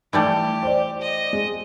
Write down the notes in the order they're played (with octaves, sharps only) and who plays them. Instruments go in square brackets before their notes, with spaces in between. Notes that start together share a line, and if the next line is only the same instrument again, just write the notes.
[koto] E3 G3 A3 [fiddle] G4
[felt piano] C5 D5
[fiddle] D#5
[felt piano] G#3